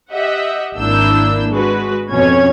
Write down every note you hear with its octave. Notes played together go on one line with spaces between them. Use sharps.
G4 D#5 E5 F#5
G#1 A#3 D4 E4 E6 G6
G#3 F#4 B4
F2 B2 C#4 C#5 G#6